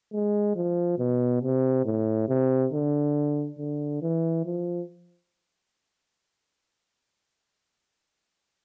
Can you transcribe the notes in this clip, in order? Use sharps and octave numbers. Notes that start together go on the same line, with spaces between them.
G#3
F3
B2
C3
A2
C3
D3
D3
E3
F3